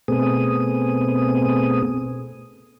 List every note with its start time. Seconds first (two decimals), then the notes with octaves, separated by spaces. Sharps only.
0.08 B2 A3 B3 C4 G#4 D#6